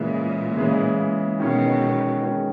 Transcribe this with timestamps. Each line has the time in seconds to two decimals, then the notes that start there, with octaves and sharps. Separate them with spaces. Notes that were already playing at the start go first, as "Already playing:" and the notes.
Already playing: A#2 C#3 E3 G#3
0.56 C#3 E3 G#3
1.40 B2 D#3 G#3 C#4
2.23 D#3 G#3 C#4